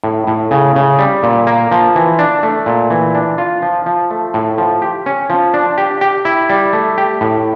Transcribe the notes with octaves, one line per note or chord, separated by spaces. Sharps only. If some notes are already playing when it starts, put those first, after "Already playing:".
A2
A2
C#3
C#3
G3
A#2
A#3
F3
E3
D4
A3
A#2
E3
D4
F4
F3
F3
A3
A2
F3
G4
C#4
F3
D4
G4
G4
E4
G3
A3
G4
A2